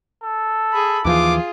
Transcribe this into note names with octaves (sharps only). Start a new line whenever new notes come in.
A4
G#4 B5
D#2 E3 F3 F4 G#4 D6